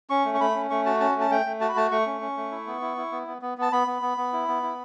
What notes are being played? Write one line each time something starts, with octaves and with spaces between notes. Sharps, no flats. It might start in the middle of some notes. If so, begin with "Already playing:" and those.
C#4 C#6
A3
C#6
A3 B5
C#4
A3 C#6
F#4 A5
C#4 A5
A3
A5
A3 G5
A3
F#4 A5
B5
A3 A5
A3 C#6
C#4
C#4
A3
E4
B3
E4
E4
B3
B3
B3
B3 A5
B3 B5
B3
B3
B3
E4
B3
E4